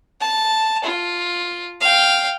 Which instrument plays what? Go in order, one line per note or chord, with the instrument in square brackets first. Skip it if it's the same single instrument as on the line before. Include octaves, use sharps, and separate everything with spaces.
[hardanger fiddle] A5
F4
F5 G5